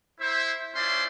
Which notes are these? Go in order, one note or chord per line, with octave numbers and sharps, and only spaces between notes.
E4 C5 E5
C#4 E4 F4 C5 D5 C6